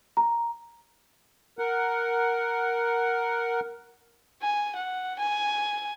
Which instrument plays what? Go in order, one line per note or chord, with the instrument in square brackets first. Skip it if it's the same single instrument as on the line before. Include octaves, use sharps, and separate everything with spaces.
[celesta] A#5
[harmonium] A#4 F#5
[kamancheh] G#5
F#5
G#5